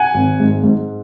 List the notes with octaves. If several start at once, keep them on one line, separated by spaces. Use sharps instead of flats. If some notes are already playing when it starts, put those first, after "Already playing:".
Already playing: F#5 G#5
G#1
G#2
G#2